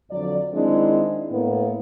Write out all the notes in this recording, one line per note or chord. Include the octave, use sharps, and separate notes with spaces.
F2 D3 F#3 D5
D#3 G#3 C4 D4 E4 D5
A2 A#3 B3